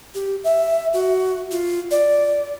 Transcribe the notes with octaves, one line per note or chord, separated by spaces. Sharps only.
G4
E5
F#4
F4
D5